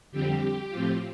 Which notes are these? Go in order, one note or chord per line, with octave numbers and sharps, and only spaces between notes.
F2 D3 G3 C4 G4
A2 F3 C4 F4